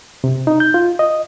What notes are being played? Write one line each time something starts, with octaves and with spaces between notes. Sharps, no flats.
C3
D#4
G6
F4
D#5